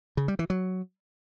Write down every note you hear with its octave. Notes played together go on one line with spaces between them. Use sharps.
C#3
G3
E3
F#3